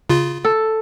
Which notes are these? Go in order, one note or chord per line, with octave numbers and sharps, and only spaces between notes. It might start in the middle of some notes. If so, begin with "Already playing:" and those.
C#3 F4
A4